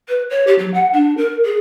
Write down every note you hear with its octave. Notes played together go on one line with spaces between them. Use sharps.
B4
C#5
G4
F#3
F#5
D4
A#4
G#4